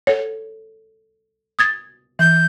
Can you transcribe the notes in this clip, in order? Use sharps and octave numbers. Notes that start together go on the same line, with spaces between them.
A4 C#5
D#6 G#6 A6
E3 G6